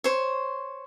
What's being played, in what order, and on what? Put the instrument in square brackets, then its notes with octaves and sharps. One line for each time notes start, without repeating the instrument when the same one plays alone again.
[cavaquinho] C5 C#5